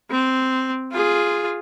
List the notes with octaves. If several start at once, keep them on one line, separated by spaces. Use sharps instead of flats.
C4
F4 G#4